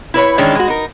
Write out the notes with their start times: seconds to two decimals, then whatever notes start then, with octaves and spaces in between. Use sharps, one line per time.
0.14 E4 B4 C#5
0.38 D#3 E3 G#3 C#4 D4
0.55 G#3 F#4
0.68 D#4 A#4